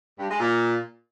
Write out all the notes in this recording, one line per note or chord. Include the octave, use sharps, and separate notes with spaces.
G2
G#3
A#2